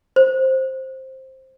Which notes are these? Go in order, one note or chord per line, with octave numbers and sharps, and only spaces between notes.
C5